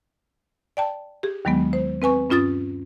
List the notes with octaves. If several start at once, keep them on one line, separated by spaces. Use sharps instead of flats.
D5 G5 A5
G4 G#4
D#2 D#3 F#3 G#3 B3
C5
C4 B4 G#5 C#6
G2 C#4 F4 D#6 A6